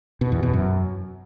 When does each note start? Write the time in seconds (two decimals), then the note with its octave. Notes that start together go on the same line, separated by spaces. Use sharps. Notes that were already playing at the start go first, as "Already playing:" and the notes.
0.21 B2
0.32 E2
0.43 B2
0.53 F#2